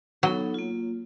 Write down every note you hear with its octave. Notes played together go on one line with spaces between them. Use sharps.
F#3 B3 D#4 A4
A#3 F4